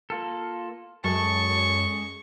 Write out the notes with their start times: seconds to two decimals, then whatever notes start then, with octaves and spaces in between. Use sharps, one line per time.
0.10 A#3 F4 A4
1.04 F#2 G#3 A4 C#6